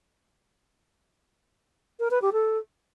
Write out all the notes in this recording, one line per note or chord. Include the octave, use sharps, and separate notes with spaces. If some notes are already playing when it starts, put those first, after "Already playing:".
A#4
B4
G4
A4